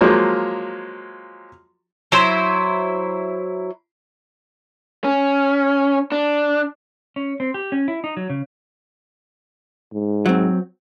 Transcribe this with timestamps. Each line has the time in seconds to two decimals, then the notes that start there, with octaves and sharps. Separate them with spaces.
0.01 F3 F#3 G#3 A#3
2.12 F#3 E4 C5
5.04 C#4
6.12 D4
7.16 C#4
7.40 C4
7.54 G4
7.72 C#4
7.88 E4
8.04 D#4
8.17 F#3
8.30 C#3
9.93 G#2
10.26 F#3 C4